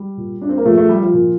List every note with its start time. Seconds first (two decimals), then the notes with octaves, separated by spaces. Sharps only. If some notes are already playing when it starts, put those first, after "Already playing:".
Already playing: G3
0.17 A#2
0.42 D4
0.49 C4
0.57 A#3
0.65 A#2 F3 A3
0.77 F3 A3
0.89 G3
1.02 F3
1.13 A#2